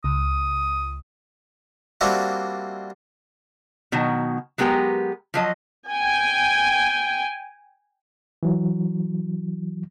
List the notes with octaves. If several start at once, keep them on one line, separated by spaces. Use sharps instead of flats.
C#2 D#6
G3 A#3 C4 D4 E4 F#4
B2 D#3 F#3
F#3 G#3 B3 G4 A#4
F3 F#3 D#5
G5 G#5
E3 F#3